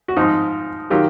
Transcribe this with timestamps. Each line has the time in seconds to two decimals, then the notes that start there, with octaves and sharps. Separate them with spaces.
0.08 F#4
0.16 G#2 F3 D#4 F4
0.90 D#3 F#3 F4 G4